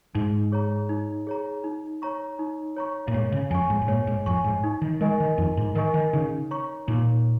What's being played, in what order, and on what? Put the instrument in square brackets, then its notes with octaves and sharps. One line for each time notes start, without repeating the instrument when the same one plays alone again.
[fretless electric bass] G#2 [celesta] D#4
[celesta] G#4 C#5 A#5
D#4
G#4 C#5 A#5
D#4
C#5 A#5 C#6
D#4
C#5 A#5 C#6
[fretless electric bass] A#2
[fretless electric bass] G#2 [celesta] C#5
[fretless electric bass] C#3
[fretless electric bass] F2 [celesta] G#5 C#6
[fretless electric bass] G#2
G#2
[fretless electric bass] A#2 [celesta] C#5
[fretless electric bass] G#2
[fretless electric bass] F2 [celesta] G#5 C#6
[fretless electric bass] G#2
[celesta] D#4
[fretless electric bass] D#3
[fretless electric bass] G#3 [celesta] A#4 D#5 G#5 C#6
[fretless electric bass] D#3
[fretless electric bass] F2 [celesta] D#4
[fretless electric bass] G#2
[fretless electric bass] D#3 [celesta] A#4 D#5 G#5 C#6
[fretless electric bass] D#3
[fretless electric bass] C#3 [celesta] D#4
[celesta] C#5 A#5 C#6
[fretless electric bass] A#2 [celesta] D#4